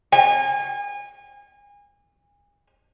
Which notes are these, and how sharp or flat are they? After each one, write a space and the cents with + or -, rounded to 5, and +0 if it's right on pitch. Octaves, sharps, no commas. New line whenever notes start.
G#5 -30